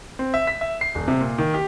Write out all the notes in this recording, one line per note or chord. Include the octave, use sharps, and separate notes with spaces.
C4
E5
B6
E5
C7
D#1
C3
A#2
D#3
G4